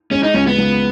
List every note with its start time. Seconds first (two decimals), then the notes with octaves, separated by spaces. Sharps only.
0.11 G#3 C#4
0.23 D#4
0.34 C#2 C#4
0.47 B3
0.58 C#2